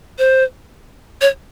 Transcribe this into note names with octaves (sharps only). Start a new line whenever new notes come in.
C5
C#5